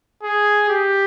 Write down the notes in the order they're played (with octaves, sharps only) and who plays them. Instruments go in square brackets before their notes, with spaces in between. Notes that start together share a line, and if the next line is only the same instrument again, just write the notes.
[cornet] G#4
G4